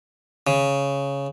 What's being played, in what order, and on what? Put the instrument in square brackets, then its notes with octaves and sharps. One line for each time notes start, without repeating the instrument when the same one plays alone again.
[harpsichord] C#3